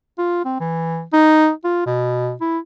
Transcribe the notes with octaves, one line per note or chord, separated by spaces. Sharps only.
F4
C4
E3
D#4
F4
B2
E4